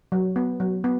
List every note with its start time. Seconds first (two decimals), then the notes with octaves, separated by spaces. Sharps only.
0.12 F#3
0.36 B3
0.60 F#3
0.84 B3